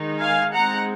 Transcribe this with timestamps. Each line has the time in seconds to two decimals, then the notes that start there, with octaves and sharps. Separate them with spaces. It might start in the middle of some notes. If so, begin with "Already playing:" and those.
Already playing: D#3 G#3 D#4
0.20 F5 G#5
0.53 G#3 C4 D#4 F#5 A#5